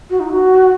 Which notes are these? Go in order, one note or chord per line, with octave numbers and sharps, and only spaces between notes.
F#4
D#4
F#4